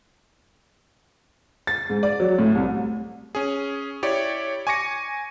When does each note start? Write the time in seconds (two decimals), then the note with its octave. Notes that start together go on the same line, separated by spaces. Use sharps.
1.67 A6
1.90 G#2
2.03 D5
2.20 F#3
2.38 A2
2.55 C2
3.35 C#4 G#4
4.03 E4 G4 C#5 D5
4.67 G#5 C#6 D6 A#6 C#7